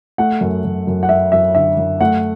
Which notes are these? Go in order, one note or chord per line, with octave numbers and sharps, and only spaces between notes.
A3 F#5
F#2
F#2
F#2
F#5
F#2 E5
F#2 E5
D3 E5
F#2
A3 F#5